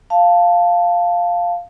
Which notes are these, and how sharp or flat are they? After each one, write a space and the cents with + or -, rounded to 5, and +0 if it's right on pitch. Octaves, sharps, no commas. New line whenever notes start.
F5 +0 A5 +0